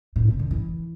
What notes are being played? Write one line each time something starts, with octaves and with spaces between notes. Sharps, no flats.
A2
B2
D3
E3